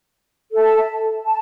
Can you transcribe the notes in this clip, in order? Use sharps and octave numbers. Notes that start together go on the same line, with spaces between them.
A4 E5 A5
A5